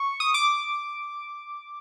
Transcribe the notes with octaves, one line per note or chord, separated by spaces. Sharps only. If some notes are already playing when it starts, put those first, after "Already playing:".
Already playing: C#6
D#6
D6